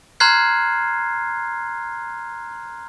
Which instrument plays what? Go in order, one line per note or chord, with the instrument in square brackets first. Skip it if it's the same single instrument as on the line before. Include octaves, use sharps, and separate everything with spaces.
[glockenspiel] A#5 C6 F6 F#6 G#6 C7